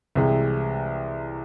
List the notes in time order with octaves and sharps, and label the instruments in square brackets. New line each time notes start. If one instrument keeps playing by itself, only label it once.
[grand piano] C2 C3 E3 G#3